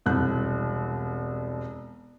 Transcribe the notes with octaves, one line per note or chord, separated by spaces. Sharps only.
E1 C2 F#6